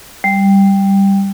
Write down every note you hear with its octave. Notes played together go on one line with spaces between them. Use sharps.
G3